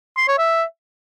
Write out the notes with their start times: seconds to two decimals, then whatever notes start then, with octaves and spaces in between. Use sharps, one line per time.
0.17 C6
0.28 C#5
0.38 E5